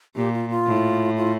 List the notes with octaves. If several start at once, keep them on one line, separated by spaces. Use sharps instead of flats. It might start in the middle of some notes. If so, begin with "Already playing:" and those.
A#2 G4
F4
F4
A2
F4